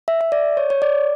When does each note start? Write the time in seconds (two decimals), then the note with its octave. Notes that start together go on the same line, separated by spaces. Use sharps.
0.08 E5
0.21 E5
0.32 D5
0.57 C#5
0.70 C#5
0.82 D5